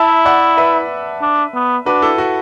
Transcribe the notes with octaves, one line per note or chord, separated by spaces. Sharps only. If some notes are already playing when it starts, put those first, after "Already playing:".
Already playing: E4 E5 A5
D5 F#5
B4 E5
D4
B3
D4 F#4 B4
E4 A4
F#4